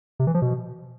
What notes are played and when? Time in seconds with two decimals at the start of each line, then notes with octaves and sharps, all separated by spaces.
0.20 C3
0.27 E3
0.34 F3
0.42 B2